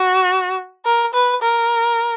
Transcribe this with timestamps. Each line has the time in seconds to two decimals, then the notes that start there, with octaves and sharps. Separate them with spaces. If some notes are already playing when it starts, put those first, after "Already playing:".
Already playing: F#4
0.85 A#4
1.14 B4
1.42 A#4